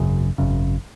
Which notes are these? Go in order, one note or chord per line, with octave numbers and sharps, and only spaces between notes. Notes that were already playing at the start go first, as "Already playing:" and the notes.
Already playing: G#1 F#2 C#3
G#1 F#2 C#3